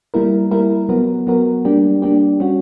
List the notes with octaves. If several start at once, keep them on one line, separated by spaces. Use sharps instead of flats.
G3 A#3 E4 A#4
G3 A#3 E4 A#4
F#3 B3 F#4 A#4
F#3 B3 F#4 A#4
G3 A#3 D4 G4
G3 A#3 D4 G4
G3 C#4 F#4